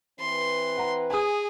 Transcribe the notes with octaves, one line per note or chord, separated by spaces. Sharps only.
E3 C4 B4 C6
F#5 A#5
G#4 G#5 D#6